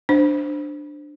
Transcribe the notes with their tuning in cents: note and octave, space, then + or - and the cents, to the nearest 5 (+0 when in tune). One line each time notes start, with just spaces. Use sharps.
D4 +10 C5 +0